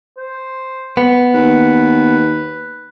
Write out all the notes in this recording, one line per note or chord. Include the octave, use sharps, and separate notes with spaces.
C5
B3
D#2 B4